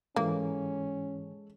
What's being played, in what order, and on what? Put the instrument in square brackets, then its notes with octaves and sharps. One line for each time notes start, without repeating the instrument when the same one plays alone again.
[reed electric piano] G#2 E3 [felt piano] G#3 A4 [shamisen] A#3 [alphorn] C#4